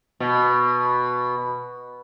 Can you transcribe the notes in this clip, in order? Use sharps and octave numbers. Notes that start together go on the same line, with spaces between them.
B2